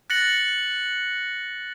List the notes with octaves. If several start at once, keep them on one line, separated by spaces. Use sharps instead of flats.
F#6 A6 A#6 C#7 F#7